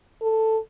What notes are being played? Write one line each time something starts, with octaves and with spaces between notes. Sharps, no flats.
A4